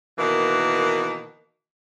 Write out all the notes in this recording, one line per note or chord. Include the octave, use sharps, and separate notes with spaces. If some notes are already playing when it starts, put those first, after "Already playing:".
B2 D#3 E3 A#3